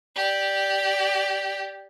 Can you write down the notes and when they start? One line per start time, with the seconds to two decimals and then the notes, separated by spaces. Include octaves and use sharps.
0.16 G4 D5